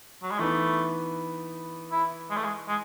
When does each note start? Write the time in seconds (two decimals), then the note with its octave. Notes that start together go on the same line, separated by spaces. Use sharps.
0.22 F#3
0.31 G#3
0.39 E3 A3 B3 D#4
1.92 E4
2.30 G#3
2.37 A3
2.44 G#3
2.68 G#3